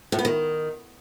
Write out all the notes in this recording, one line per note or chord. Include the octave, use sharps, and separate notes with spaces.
A2
B3
D#3